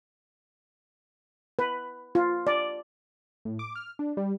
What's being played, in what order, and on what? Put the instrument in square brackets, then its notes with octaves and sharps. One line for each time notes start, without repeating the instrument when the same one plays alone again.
[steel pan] B4
F4
D5
[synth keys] A2
D6
F6
D4
G3